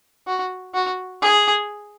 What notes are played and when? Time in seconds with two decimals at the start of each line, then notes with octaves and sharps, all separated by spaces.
0.27 F#4
0.74 F#4
1.22 G#4